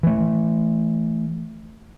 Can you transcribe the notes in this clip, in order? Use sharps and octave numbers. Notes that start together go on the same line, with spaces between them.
E3 A3